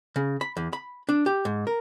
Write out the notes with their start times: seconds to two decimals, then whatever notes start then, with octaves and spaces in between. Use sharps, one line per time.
0.16 C#3
0.41 B5
0.57 E2
0.73 B5
1.09 D4
1.26 G4
1.45 G#2
1.67 A#4